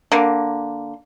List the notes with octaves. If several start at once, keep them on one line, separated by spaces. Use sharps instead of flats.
D3 A#3